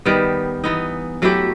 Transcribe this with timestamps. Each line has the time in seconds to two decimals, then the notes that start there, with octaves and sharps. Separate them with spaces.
0.05 D#3 G3 B3
0.64 E3 B3 D#4
1.22 F#3 A3 E4 G4